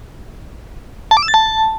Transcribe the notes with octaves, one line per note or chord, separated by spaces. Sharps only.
A5
D6
E6
A6
A5